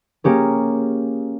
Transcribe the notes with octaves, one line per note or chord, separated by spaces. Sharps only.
A#3 C#4 G4 G#4